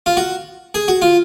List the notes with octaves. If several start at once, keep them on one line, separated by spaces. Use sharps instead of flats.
F4
F#4
G#4
F#4
F4